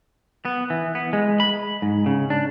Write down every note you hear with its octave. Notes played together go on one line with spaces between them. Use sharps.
B3
E3
B3
G#3
B5
G#2
C#3
D4